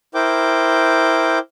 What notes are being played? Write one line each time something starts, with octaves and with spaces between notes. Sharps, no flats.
E4 A#4 C5 G5 D6